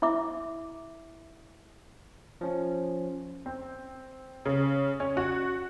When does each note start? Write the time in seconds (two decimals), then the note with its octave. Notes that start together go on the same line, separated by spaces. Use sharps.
0.02 E4 E5 D6
2.41 F3 C#4
3.46 C4
4.45 C#3
5.00 C#4
5.17 F#4